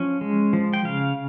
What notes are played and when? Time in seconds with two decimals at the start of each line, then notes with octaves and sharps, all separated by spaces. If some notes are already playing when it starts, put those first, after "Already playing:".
Already playing: F3 C#4
0.21 G#3
0.53 F3
0.73 G5
0.84 C#3 F5